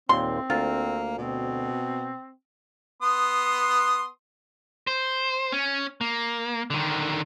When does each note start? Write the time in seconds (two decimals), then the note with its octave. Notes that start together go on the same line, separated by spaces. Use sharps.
0.09 D#2 A#2 C4 C6
0.50 D2 A#3 F4
1.18 B2 C4
3.02 B3 C6 D#6
4.87 C5
5.52 C#4
6.01 A#3
6.70 D3 D#3